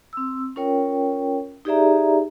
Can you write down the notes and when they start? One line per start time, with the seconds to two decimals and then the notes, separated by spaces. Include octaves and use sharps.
0.13 C4 E6
0.56 C#4 F4 A#4 C#5 G5
1.65 D#4 G4 G#4 D5 E5 A#5